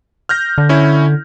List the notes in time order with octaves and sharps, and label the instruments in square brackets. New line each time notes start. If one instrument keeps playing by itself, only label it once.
[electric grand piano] F6 G6 A#6
[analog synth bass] D3
[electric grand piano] C#4 E4